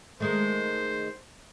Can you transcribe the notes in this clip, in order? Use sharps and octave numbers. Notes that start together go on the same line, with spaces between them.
D#3 G#3 A3 C5